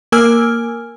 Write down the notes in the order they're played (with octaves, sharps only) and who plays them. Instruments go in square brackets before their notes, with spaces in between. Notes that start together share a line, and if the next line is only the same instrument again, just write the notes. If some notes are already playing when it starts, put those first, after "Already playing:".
[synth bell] A#3 A#4 G#5 E6 F6